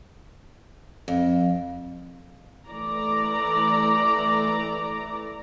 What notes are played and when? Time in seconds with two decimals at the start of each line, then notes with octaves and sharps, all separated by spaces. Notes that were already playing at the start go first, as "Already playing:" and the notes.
1.08 F2
2.67 E3 A3 D5 A#5